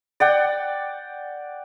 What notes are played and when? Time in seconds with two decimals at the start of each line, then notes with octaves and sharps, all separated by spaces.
0.20 D5 F#5 G5